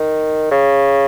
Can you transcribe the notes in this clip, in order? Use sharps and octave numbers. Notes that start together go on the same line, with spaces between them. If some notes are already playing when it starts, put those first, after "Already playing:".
Already playing: D#3
C#3